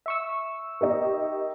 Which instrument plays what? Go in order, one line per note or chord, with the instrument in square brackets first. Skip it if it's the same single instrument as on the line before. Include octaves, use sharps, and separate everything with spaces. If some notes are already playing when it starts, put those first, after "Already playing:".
[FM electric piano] E5 C#6 E6
[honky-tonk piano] D#4 G4 A#4